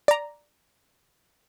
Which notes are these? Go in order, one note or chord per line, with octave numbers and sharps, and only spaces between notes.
D5 A#5